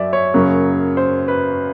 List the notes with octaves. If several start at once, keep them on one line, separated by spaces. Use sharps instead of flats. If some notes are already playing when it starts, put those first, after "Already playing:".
Already playing: F#2 F#3 D5 E5
C#5
F#2 C#3 F#3 A#3
C5
B4